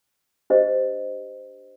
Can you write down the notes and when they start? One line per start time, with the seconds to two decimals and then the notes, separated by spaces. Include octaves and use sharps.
0.50 D4 G4 C5 D#5